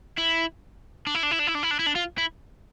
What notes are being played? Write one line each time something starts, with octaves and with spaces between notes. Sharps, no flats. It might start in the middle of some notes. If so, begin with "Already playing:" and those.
E4
D4
E4
D4
E4
D4
E4
D4
E4
D4
E4
D4
F4
E4